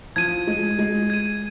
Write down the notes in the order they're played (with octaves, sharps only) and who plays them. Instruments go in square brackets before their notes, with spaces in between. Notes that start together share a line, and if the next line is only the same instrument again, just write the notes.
[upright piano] F3 [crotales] G#6 D#7
[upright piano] G#3
G#3
[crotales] G#6 D#7